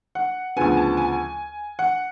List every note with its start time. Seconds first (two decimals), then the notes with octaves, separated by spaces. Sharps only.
0.15 F#5
0.56 D2 C#3 F3 B3 G#5
0.77 A5
0.97 G#5
1.79 F#5